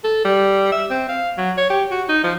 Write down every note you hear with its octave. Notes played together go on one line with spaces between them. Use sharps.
A4
G3
E5
C4
F5
F#3
C#5
G4
F#4
D#4
F3